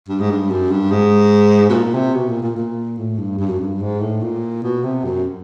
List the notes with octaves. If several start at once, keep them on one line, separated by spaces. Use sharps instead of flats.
G2
G#2
G2
F#2
G2
G#2
B2
A#2
C3
B2
A#2
A#2
A#2
A2
G2
G2
F#2
G2
G#2
A2
A#2
B2
C3
F#2